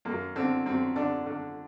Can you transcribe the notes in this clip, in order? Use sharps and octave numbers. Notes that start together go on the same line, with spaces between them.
F#2 A#3
D3 C4
F#2 C4
D3 D4
D3